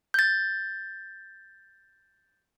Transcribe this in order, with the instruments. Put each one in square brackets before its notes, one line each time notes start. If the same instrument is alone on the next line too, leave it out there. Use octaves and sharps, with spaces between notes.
[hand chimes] G6 A6